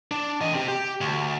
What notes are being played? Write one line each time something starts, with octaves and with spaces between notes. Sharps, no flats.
D4
E3 D#5
C4 G4
G4
D2